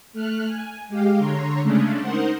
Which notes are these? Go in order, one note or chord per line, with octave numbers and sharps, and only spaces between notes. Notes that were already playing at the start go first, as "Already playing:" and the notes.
A3 F6 F#6
G#5
G#3 G4 F5
D3 C#5 A#5 C6
C#3 G#3 A3 C#4 D4
D#4 A#4 C5 F#5 C6